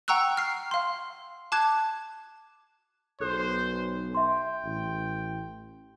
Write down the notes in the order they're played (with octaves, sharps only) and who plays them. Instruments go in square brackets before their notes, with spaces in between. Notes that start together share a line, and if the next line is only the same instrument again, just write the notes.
[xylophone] F#5 G5 A#5 C#6 E6 F#6
F6 C7
F5 C6
A5 D6 F#6 G#6
[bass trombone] B1 [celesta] A4 F#6 [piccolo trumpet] C5
[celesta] E5 C6 [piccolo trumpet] G5
[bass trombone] A1